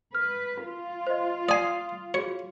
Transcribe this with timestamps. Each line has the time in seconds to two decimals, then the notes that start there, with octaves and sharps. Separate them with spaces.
0.15 B4 F6
0.66 F4
1.07 C5 D#5
1.49 D5 G#5 D#6 C7
2.14 F#4 G#4 C#5